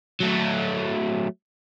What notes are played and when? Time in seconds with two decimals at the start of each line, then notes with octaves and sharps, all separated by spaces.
0.20 F#3 A3